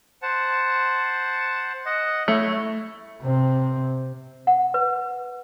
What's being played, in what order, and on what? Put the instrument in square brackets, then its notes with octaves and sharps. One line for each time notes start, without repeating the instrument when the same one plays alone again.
[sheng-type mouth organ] C5 F#5 A5
D#5 F#5
[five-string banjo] A3 [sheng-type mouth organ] E4 C#5
[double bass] C3 C4
[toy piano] F#5
B4